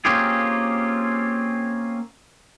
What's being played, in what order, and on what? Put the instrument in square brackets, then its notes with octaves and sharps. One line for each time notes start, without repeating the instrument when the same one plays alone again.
[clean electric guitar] A#3 C4 C#4 F4 G4 G#4